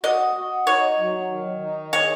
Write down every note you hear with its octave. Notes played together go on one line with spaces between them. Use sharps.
F#4 D#5
F#4
D#4 C#5
F#3
D#3
D#4
G#4 C#5